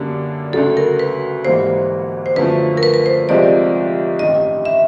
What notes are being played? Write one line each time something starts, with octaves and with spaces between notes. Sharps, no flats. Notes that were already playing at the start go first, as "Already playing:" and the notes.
Already playing: F#2 D3 G3 A#3 D4
D2 C#3 F#3 A4
A#4
B4
G#1 G#2 E3 G3 A#3 C5
C5
F#2 D3 F3 A3 B4
A#4
B4
B4
C5
C2 C3 F3 G#3 C4 D5
A1 G2 D#3 D#5
E5